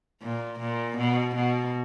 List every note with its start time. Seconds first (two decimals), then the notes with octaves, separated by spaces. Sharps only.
0.22 A#2
0.60 A#2
0.98 B2
1.35 B2